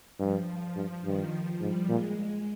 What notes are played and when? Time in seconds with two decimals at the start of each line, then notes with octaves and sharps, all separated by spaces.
0.19 G2 F3
0.47 F3
0.76 G2 F3
1.04 G2 D#3
1.32 F3
1.61 G#2 G3
1.89 A#2 G#3
2.17 G#3